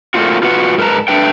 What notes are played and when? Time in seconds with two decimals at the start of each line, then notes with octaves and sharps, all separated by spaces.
0.14 A3 A#3 C4 F4 F#4
0.43 F4 F#4 B4 F#5
0.78 G#2 A#4 B4 A5 A#5
1.08 A3 D4 B4 G5